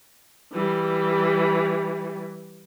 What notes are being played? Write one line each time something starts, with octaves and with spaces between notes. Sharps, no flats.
E3 G3